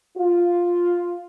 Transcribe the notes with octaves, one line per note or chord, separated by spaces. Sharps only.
F4